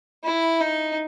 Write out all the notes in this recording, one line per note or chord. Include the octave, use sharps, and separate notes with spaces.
E4
D#4